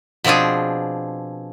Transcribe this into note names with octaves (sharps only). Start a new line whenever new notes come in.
B2 F3 C4 D4 G#4